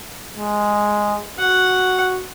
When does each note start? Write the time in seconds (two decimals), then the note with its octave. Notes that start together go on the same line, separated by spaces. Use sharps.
0.37 G#3
1.39 F#4 F#5